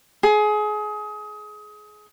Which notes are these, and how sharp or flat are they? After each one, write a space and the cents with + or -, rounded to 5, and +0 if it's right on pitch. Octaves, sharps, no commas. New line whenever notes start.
G#4 +25